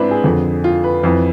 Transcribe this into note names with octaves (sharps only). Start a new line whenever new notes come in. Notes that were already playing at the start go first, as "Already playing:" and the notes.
Already playing: G#2 C4 D4 E4 B4
G#4
F2 D3
F4
B4
F2 E3